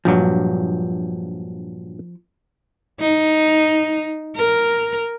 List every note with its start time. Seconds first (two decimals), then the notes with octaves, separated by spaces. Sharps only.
0.05 A#1 G2 F3 F#3
3.00 D#4
4.36 A#4